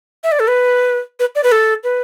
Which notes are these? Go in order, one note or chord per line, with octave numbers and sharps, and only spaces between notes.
E5
D5
A4
B4
B4
D5
B4
A4
B4